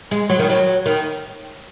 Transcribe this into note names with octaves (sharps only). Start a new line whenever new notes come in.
G#3
F#3
D#3
F#3
D#3